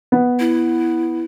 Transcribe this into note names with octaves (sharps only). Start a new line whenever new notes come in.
B3
E4